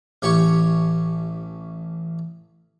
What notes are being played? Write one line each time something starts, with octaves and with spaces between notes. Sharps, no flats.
A1 G4 C#5 C#6